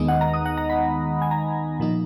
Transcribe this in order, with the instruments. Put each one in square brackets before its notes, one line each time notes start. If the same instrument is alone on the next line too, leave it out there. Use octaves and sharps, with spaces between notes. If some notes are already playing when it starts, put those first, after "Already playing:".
Already playing: [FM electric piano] D#2 D#3 G#3 B3 D#4 D#5
F#5
A#5
D#6
F#5
A#5
B5
G#5
A#5
A#2 F3 A#3 D#4